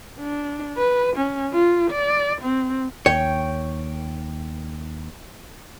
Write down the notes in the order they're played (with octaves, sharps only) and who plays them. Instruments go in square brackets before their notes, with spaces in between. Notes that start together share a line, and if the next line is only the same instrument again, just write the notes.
[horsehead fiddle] D4
B4
C#4
F4
D5
C4
[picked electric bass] D#2 [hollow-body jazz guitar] C#5 [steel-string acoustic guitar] G5